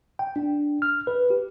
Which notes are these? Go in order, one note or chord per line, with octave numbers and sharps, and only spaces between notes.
G5
D4
F6
B4
G4